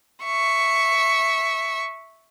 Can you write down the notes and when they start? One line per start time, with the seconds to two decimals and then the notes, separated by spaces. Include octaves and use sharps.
0.24 E5 C#6